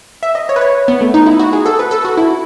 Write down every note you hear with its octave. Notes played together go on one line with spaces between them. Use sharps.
E5
D#5
C#5
B4
C#5
B3
A3
D#4
E4
F#4
G#4
A4
B4
A4
F#4
E4